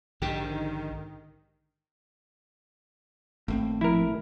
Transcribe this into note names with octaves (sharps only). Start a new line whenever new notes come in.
A#1 G#2 D3 D#3 G4
G#1 A2 A#3 C4
F3 E4 A#4